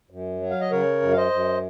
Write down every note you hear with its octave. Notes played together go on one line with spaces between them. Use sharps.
F#2
F#3
F5
D#5
C#3 A#4 C#5
F#2
F5
C5 D#5
F#2